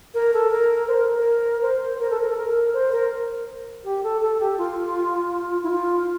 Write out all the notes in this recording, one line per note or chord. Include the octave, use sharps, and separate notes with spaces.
A#4
A4
A#4
C5
A#4
A#4
C5
A#4
A4
A#4
A4
A#4
C5
A#4
G4
A4
A4
G4
F4
E4
F4